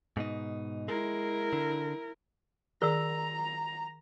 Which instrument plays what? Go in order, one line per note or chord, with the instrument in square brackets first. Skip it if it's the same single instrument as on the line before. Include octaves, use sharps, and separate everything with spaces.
[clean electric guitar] G#2 B2 D#4
[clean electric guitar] G#3 [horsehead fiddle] E4 A#4
[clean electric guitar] D3
[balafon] D#3 G#4 [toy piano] A#4 E6 [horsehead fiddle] A#5